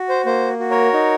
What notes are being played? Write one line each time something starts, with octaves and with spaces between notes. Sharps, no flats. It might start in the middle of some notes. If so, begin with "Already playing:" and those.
Already playing: F#4
C5
A#3 C5
F#4
A#4 C#5
D#4